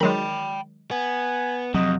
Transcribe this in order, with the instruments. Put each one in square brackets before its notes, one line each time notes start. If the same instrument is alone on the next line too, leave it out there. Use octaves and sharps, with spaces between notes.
[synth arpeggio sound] D#3 F#3 G#3 [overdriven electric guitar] G5 B5
[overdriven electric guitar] B3 [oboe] G#5
[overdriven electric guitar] F2 C3 [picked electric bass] F#3 [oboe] D#5